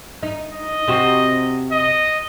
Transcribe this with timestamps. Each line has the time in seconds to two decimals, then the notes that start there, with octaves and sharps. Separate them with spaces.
0.23 D#4
0.52 D#5
0.88 C3 C4 F#4
1.72 D#5